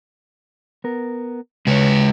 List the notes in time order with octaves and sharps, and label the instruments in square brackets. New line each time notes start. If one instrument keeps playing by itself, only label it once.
[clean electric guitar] B3 A#4
[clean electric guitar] C#3 C#5 [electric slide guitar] G#3 B4